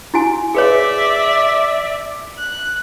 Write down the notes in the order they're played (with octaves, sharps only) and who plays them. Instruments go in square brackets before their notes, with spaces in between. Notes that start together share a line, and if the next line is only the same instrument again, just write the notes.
[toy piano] E4 F#4 G#5
[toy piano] G#4 B4 C#5 [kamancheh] D5 E5
[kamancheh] F#6